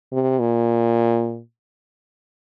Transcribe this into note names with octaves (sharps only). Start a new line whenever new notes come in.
C3
A#2